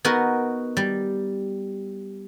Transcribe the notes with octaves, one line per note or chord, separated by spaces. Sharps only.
B3 D#4 F#4 A#4
G3